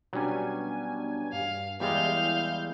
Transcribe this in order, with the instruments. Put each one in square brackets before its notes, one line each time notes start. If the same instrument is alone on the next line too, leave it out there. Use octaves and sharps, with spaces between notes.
[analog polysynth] B2 D4 G#5 [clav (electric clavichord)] F#3 G3 C#4
[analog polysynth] G2 [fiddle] F5
[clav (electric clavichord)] E2 G3 G#3 [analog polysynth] E4 G6 [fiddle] F5